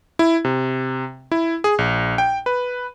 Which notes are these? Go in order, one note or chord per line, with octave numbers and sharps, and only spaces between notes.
E4
C3
E4
G#4
A#1
G5
B4